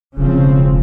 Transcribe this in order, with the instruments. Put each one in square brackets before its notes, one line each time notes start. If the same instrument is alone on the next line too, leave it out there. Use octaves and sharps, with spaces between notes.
[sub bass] E1 [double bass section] C#3 F3 C4